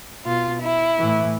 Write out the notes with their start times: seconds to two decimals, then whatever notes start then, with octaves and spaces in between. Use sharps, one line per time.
0.25 B2 F4
0.61 E4
0.98 A2 E3